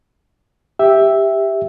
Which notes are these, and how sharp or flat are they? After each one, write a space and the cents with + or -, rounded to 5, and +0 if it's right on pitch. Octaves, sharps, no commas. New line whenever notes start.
G4 +5 E5 -5